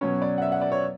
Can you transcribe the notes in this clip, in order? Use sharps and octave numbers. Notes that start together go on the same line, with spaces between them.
B2 F#3 C#4 C#5
D5
F#5
E5
F#5
D5
C#5